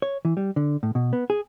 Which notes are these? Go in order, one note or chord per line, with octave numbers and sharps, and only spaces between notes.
C#5
E3
G3
D3
A2
B2
B3
G#4